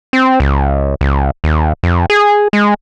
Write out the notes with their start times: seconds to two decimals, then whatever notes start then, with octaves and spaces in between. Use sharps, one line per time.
0.13 C4
0.40 C#2
1.01 C#2
1.44 D#2
1.83 F2
2.10 G#4
2.53 G#3